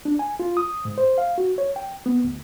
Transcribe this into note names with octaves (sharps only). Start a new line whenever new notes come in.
D4
G#5
F4
D#6
G#2
C5
F5
F#4
C#5
G5
B3
D2